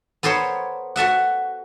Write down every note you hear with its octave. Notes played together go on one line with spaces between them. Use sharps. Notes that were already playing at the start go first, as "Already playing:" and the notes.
B3 A4 A#4 C5 C#5
F#4 A4 E5 F#5